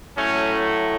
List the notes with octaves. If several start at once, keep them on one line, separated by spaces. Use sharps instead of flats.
A2 F#3 A3 C#4